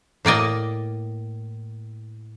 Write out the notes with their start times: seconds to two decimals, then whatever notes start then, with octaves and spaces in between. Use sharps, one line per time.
0.25 A2 A#3 D5 D#5